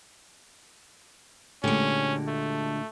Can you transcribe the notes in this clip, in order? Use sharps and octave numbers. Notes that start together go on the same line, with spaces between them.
D2 A#2 D3 G#3 C#4 G4
A3